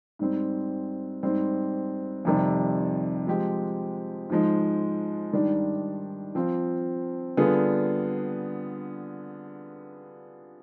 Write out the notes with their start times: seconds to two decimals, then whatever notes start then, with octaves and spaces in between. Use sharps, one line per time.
0.19 G#2 G3 C4
1.23 G#2 G3 C4
2.25 F2 C3 D#3 G3
3.27 F3 G#3 C4 G4
4.30 G#2 F3 G#3
5.33 G#2 D#3 G3 D4
6.35 F3 C4 F4
7.37 D3 G3 B3 F4 G#4